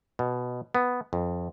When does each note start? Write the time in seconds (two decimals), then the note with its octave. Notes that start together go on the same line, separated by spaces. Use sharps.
0.19 B2
0.75 B3
1.13 F2